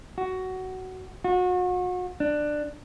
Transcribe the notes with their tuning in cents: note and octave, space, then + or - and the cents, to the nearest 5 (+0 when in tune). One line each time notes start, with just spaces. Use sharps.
F#4 +15
F#4 -35
D4 +15